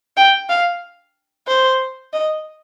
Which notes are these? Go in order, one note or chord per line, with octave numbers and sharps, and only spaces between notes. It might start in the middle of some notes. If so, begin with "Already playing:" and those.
G5
F5
C5
D#5